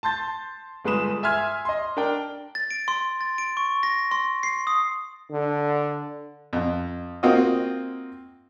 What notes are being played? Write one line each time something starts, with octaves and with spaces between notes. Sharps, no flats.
A5 C6 G6 A6
G1 G#3 B4 D#6 E7
E5 G#5 C6 F6 G#6
D#5 C6
D4 A#4 G5
A6
D7
C6
A6
D7
C#6
A#6
C6
C7
D#6
D3
F2
A#3 C4 F4 F#4 D#5